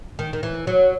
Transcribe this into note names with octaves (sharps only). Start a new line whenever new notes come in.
D#3
D#3
E3
F#3